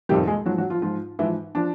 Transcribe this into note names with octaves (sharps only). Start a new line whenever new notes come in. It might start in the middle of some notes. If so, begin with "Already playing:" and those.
F2 C3 D#3 G3 G4
G#3 G#4
G#2 F3 F#3 F#4
F#3 F#4
F3 F4
G#2 F3 F4
G#2 E3 F3 E4
F3 D4